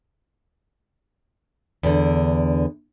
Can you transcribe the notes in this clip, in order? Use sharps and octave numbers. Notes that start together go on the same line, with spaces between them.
E2 D3